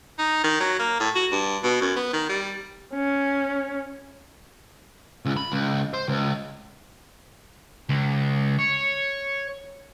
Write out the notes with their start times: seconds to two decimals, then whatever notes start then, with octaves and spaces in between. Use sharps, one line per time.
0.19 D#4
0.44 D#3
0.60 F#3
0.79 A#3
1.00 A2
1.15 F#4
1.32 G2
1.63 B2
1.81 F#2
1.96 B3
2.13 D#3
2.29 G3
2.94 C#4
5.25 C#2
5.37 B5
5.52 C#2
5.94 C5
6.08 C#2
7.89 C#2
8.59 C#5